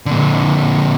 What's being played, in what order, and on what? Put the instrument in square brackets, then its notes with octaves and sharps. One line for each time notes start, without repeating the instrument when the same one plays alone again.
[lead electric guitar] A#2 D3